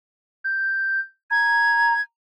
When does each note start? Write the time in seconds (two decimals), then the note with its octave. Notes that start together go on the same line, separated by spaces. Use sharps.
0.44 G6
1.31 A#5 G#6